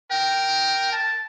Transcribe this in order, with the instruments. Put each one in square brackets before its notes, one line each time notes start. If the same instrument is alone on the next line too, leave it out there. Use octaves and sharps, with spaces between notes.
[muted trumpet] A#4 [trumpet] G5
[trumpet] A5